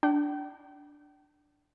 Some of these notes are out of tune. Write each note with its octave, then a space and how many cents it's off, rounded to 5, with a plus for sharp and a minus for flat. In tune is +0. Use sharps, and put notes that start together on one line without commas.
D4 +0 G5 -40